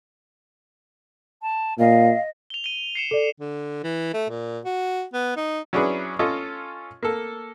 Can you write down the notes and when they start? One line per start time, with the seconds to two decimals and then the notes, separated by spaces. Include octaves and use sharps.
1.42 A5
1.79 A#2 D#5 F5
2.50 F7 G7
2.64 D#7 G7
2.95 C7 C#7 E7
3.11 A4 D5
3.40 D3
3.84 E3
4.13 A3
4.30 A#2
4.65 F#4
5.13 B3
5.37 D#4
5.73 F#3 C#4 D4 E4 G#4 B4
6.19 C#4 F4 A4 D#5
7.03 A#3 A4